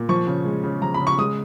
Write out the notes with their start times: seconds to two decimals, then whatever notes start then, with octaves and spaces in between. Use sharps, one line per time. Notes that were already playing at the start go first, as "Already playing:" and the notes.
Already playing: A#2
0.09 F3 C#6
0.27 C#3
0.45 G#3
0.63 C#3
0.82 F3 A#5
0.94 B5
1.00 C#3
1.07 C#6
1.18 G#3 D#6